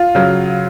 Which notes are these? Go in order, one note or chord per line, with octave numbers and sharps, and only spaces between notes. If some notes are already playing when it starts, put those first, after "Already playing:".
Already playing: F4
C#3 F#3